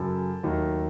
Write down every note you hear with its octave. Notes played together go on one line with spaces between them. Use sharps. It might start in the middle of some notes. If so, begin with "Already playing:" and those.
Already playing: F#2 C#3 F#3 A4
D#2 D#3 F#3 A3 D#4